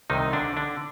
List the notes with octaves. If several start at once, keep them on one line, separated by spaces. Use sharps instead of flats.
C2 C3 D#3 D#4
D3 D4
D3 D4